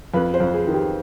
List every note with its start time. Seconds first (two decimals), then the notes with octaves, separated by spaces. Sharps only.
0.14 F2 B4
0.34 C5
0.40 F2
0.53 G#4
0.67 D#3
0.74 G4